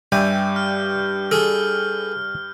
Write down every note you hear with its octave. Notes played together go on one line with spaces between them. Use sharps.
G2 G3 G4 E5 G5 G#5 G6
F6
G#4 A4 F6